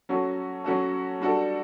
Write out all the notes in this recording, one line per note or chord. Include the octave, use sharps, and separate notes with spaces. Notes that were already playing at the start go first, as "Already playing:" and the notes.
F#3 C#4 F#4 A4
F#3 C#4 F#4 A4
G3 D4 F#4 A4